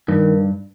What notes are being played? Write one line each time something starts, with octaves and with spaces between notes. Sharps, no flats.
G2 D#3